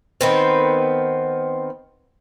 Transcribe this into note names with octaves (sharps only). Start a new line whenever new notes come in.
D#3 B3 C4